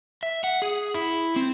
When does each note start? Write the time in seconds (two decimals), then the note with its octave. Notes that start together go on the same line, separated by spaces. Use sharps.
0.23 E5
0.44 F#5
0.62 G#4
0.94 E4
1.36 C4